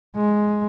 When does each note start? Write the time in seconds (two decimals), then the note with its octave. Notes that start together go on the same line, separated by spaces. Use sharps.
0.16 G#3